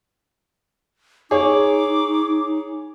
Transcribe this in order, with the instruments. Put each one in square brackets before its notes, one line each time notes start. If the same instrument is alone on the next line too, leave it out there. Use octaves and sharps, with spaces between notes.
[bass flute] D#4 [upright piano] G#4 C#5 [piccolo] D6